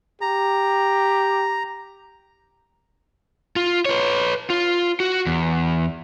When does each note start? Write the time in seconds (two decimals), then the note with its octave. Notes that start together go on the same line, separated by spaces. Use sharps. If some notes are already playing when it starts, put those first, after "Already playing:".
0.21 G4 A#5
3.56 F4
3.85 B4 C#5
4.50 F4
5.00 F#4
5.26 E2